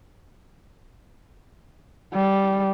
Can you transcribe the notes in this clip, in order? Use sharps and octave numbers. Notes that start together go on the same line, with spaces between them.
G3